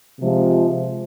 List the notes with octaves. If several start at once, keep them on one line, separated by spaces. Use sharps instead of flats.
C3 F3 G#3